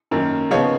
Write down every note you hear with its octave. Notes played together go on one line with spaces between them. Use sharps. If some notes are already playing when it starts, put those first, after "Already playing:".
F#2 D#3 A#3
C#3 F3 B3 D#4 C#5 F5